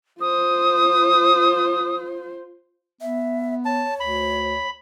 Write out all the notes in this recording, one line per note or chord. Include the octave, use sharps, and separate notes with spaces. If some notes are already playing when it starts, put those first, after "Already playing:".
F4 C5 D#6
B3 E5
C#5 A5
D2 B5